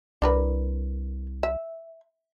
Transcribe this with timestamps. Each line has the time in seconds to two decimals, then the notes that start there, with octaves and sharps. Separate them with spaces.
0.22 C2 D4 A#4 B4
1.43 E5